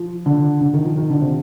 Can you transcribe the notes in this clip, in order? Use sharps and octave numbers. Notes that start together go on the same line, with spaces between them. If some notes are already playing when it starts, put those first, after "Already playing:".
Already playing: F3
D3
D3
D#3
F3
D#3
D3
C3